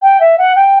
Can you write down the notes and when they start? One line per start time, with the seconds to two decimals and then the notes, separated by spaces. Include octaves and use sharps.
0.02 G5
0.20 E5
0.38 F#5
0.56 G5